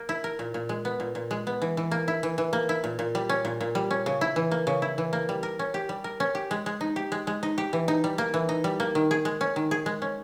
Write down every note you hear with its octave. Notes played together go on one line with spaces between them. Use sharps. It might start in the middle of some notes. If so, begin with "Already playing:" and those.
Already playing: A#3
E4
A#4
A#2
A#2
G#3
B3
A#2
A#2
G#3
B3
E3
E3
A#3
E4
E3
E3
A#3
E4
A#2
A#2
G3
C#4
A#2
A#2
G3
C#4
C#3
E4
E3
A#3
C#3
E4
E3
A#3
G3
A#4
C#4
G4
G3
A#4
C#4
G4
G#3
G#3
D#4
G4
G#3
G#3
D#4
G4
E3
D#4
G3
A#3
E3
D#4
G3
A#3
D#3
G#4
G#3
C#4
D#3
G#4
G#3
C#4